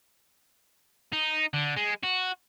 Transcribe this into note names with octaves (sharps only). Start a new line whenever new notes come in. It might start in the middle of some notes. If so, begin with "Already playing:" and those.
D#4
D3
G#3
F#4